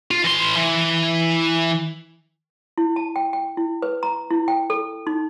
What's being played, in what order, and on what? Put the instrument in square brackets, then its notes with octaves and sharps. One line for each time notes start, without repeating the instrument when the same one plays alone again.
[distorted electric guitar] F4
E3 C6
E3
[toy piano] E4
A5
G5
G5
E4
B4
A#5
E4
G5
A4
D#4